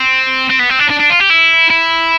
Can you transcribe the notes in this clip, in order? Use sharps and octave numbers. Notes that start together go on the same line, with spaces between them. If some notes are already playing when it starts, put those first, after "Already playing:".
Already playing: C4
C4
B3
C4
D4
D4
D4
F4
G4
E4
E4